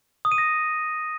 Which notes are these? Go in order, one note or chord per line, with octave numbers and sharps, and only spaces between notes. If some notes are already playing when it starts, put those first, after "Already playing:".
D#6
D#7
A#6